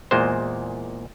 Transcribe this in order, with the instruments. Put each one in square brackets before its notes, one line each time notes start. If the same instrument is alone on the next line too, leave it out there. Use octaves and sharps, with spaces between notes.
[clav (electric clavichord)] E2 A#2 G#3 C5